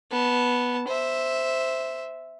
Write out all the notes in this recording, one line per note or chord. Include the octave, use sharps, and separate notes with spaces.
B3 A5
C5 E5